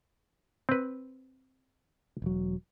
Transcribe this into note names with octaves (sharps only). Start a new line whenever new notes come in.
C4 B4
E1 F#3